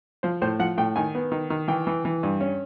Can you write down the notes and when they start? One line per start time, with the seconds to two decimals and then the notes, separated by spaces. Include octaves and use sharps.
0.23 F3 C5
0.42 A2 C5
0.59 F3 F#5
0.78 A2 G5
0.96 D#3 G#5
1.15 B3
1.32 D#3
1.50 D#3
1.68 E3 G5
1.87 E3
2.05 E3
2.23 G2
2.41 C#4